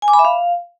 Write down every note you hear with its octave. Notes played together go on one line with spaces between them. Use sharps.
G#5
D6
B5
E5
F5